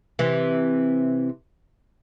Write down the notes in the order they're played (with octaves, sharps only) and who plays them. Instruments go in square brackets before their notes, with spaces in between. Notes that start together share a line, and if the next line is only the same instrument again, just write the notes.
[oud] C3 E3